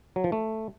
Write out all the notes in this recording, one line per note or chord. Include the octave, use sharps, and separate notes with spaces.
F#3
F3
A3